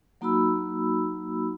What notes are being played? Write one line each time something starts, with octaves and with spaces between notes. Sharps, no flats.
F#3 A#3 D#4 F#4 B5 E6